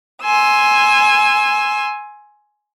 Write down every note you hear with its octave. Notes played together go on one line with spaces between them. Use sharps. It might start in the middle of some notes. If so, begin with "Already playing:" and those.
G#5 C6 E6